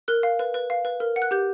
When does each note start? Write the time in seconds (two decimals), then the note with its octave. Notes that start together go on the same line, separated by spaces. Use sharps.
0.08 A#4 F#6
0.23 F5
0.39 B4
0.54 B4
0.70 F5
0.85 B4
1.00 A#4
1.16 F#5
1.22 F#6
1.31 G4 G6